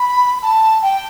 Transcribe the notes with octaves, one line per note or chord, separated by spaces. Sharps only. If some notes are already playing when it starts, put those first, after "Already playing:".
Already playing: B5
A5
G5